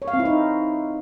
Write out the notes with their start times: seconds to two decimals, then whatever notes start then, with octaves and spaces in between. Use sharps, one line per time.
0.02 C#5
0.08 F5
0.14 C4
0.19 E4
0.25 D#4